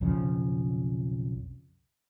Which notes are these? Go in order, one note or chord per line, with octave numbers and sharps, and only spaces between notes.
B1 F2 C#3 F3